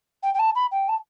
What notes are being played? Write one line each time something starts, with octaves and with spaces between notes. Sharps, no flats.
G5
G5
A5
B5
G5
A5